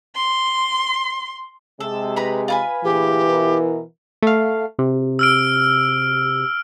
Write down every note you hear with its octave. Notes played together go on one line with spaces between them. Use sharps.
C6
C3 G#3 A4
B4 A#5 B5
F4 B4 G#5
D2 A#2 E3 G4 G#4
B2 E4 A#4
A3 F5
C3
E6 F6 D7